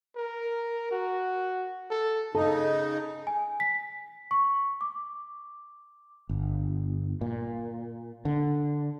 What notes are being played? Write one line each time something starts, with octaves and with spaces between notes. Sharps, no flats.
A#4
F#4
A4
C#3 D#4 A4 A5
G#5
B6
C#6
D6
G1
A#2
D3